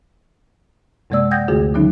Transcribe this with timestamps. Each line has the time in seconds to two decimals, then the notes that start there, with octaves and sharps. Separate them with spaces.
1.10 F#2 C3 G#3 A#3 D5 E6
1.31 F#5 G5 D#6 G6 G#6 A#6
1.48 D2 D3 A3 F4 F#4 G#4
1.74 D3 D#3 F#3 A#3 C#4 D#4